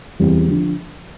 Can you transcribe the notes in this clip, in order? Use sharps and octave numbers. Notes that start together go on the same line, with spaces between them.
E2 E3 G3 C4 G4
D3 F3